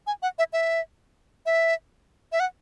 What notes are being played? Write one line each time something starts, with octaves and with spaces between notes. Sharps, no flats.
G#5
F#5
E5
E5
E5
E5
F#5